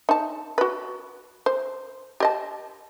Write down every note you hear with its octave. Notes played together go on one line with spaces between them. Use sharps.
D#4 A5
F#4 B4
C5
G4 D#5 A5